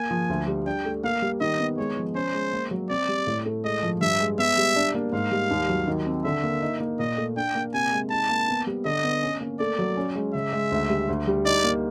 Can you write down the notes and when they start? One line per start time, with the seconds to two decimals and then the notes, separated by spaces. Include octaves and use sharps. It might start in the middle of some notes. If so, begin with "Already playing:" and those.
Already playing: A#3 G#5
0.11 F3
0.29 D2
0.48 G3
0.66 D4 G5
0.85 A3
1.04 A#3 F5
1.22 G3
1.41 D#3 D#5
1.59 B3
1.77 G#3 C#5
1.97 F3
2.15 C#4 C5
2.34 G#3
2.53 A#3
2.71 F#3
2.90 C4 D5
3.08 G3
3.27 A2
3.46 A3
3.64 G#3 D#5
3.83 F3
4.01 G2 E5
4.20 G#3
4.38 B3 E5
4.57 G3
4.76 D4
4.94 A#3
5.12 G#2 F5
5.32 G3
5.51 D#2
5.69 F#3
5.88 D#3
6.06 C4
6.25 D3 E5
6.44 A#3
6.62 D#4
6.80 A#3
6.99 A#2 D#5
7.17 A3
7.36 D4 G5
7.55 A#3
7.74 C3 G#5
7.92 G#3
8.11 D#4 A5
8.29 A#3
8.48 B3
8.67 G3
8.85 D3 D#5
9.04 B3
9.22 C#4
9.41 A#3
9.59 A3 D5
9.79 F#3
9.97 C#4
10.16 G#3
10.34 C#3 E5
10.53 G#3
10.72 D2
10.90 G3
11.09 D2
11.27 G3
11.45 D#4 D5
11.64 A#3